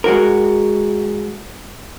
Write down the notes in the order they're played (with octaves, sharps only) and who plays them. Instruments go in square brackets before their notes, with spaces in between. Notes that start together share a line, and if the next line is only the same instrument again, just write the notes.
[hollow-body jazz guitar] G#3 F#4 A#4